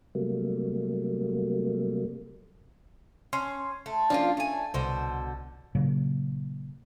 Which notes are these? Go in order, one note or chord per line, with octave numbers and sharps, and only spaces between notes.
C3 F#3 G3 A3 A#3
C#4 C6
A3
F3 A#3 C#4 D4 F4
A3 G#5
C2 B2 D3 C5
A#2 C#3 F#3 A#3